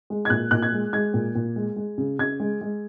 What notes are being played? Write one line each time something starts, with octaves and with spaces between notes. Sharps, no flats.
G#3
G#6
A#2 F#6
A#2 F#6
G#6
G#3
G#3 G#6
A#2
A#2
G#3
G#3
C#3
C#3 G#6
G#3
G#3